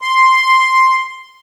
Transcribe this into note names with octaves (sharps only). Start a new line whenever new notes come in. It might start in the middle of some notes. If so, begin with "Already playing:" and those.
C6